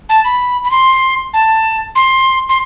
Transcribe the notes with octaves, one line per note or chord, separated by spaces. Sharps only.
A5
B5
B5
C6
A5
C6
C6